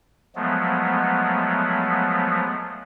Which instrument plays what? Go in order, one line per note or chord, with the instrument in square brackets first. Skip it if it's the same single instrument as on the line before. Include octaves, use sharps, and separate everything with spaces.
[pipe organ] F3 F#3 G#3 A3 B3